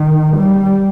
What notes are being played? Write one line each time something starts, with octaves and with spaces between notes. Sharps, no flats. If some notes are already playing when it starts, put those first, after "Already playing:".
Already playing: D#3
G3